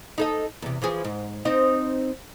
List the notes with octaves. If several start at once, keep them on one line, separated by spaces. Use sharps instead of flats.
D#4 A4 D#5
E2 C3
E3 F3 G#4
G#2
C4 D#4 D#5